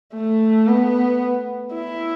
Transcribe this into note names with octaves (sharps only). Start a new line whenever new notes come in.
A3
B3
E4